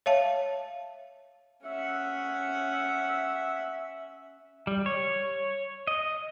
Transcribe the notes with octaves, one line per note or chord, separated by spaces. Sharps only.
C#5 E5 F5 A5
C#4 E5 F#5
G3
C#5
D#5